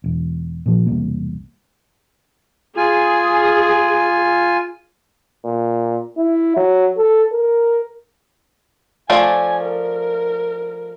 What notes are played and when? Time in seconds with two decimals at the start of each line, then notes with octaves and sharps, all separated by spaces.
0.04 E1
0.66 A#2 F3
0.86 E1 C2 A#3
2.77 F4 G#4 G#5
5.45 A#2
6.17 E4
6.56 F#3
6.97 A4
7.32 A#4
9.10 F3 A3 D5 G#5
9.64 A#4